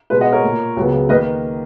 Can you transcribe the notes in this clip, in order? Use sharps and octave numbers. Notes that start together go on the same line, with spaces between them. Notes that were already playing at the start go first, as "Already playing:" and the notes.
B2 G#3 B3 B4
D#5 F#5
A#4 C#5
A#2 A#3
C#2 C#3 F#3 B3
D#3 A#3 B4 D#5